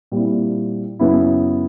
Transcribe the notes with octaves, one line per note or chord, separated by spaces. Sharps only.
A#2 G3 C4 E4
F#2 C#3 F#3 B3 E4